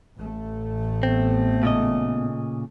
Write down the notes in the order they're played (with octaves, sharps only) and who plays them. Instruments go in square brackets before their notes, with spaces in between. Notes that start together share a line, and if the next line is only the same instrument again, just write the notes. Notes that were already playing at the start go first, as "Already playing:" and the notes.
[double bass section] A1 A3
[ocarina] B3 [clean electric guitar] C4
[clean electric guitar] A#2 C#3 D#5